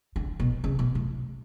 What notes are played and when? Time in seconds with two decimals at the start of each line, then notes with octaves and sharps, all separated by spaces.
0.16 D3
0.40 B2
0.64 C#3
0.79 B2
0.95 A2